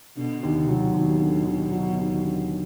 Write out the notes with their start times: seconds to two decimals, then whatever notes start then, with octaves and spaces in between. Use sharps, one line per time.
0.17 B2 D3
0.43 D#2
0.56 C3
0.69 F#3
0.94 D#2 B2
1.21 D3
1.45 D#2
1.72 F#3
1.98 D#2
2.23 D3